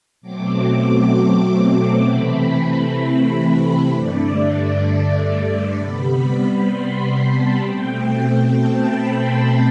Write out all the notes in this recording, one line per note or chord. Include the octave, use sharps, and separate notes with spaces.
B2 F#3 A3 C4 D6
C3 E3 A3 C4 B5
G2 D3 A3 D5
C3 G3 B3 B5
C6
B5
A5
B2 A3 C4 G5
A5
B5
C6